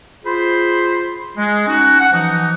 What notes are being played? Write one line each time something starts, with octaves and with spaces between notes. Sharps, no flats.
F4 G#4 C5 B5
G#3
C#4 D#4 F#4
F#5
E3 F3 D#4 F#4